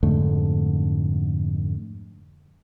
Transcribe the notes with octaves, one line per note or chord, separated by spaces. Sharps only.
F2 G#2 D3 A3